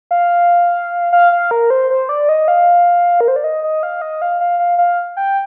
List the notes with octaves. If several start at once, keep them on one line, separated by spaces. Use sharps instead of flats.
F5
F5
F5
A#4
C5
C5
D5
D#5
F5
A#4
C5
D5
D#5
D#5
F5
D#5
F5
F5
F5
F5
G5